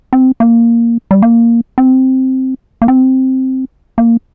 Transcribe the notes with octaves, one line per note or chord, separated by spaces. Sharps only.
C4
A#3
G3
A#3
C4
A#3
C4
A#3